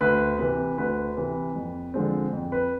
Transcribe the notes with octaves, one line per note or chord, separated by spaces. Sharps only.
D2 B4
C3 E3 B4
D2 B4
C3 E3
F2
D3 F3 G#3 C4
F2
B4